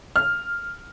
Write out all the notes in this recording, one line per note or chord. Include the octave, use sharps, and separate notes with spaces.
F6